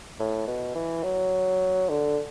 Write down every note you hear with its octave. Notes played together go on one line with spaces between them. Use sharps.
A2
B2
E3
F#3
D3